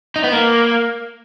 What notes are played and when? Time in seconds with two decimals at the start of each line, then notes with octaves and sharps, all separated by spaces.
0.16 D#4
0.24 B3
0.32 A#3